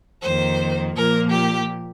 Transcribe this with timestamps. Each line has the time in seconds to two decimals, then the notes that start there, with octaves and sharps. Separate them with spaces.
0.23 F2 D#3 A#3 C5
0.95 A#2 F3 A#3 A#4
1.31 G4